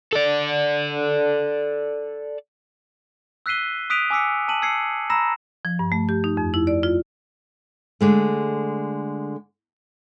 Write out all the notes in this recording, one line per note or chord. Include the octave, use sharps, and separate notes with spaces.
A4 D5
E6 F#6 B6 C7 D#7 G7
D#6 F#6 B6 D7 D#7 F7
G#5 D6 E6 B6 C#7
A5 D#7 F#7
E6 G#6 C7 C#7
A#5 B5 E6 A#6 E7
F3
G2
A3
G4
D#4
F2
E4
D5
F4
D3 G#3 A3